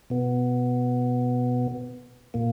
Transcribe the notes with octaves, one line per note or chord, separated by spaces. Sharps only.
B2 B3
A#2 A#3